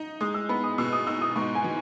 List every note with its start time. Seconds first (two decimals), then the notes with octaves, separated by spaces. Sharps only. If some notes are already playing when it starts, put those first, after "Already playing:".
Already playing: D#4
0.21 G#3 D#6
0.34 E6
0.49 B3 B5
0.64 D#6
0.78 B2 E6
0.92 D#6
1.07 D#4 E6
1.21 D#6
1.36 G#2 C#6
1.55 G#5
1.64 E3